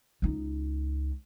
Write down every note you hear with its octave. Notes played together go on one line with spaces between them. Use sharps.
C#2 D#4